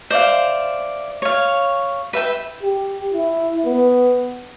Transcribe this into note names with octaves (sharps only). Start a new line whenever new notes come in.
C5 D5 E5 F5
C#5 F5
B4 E5 G5
G4
E4
B3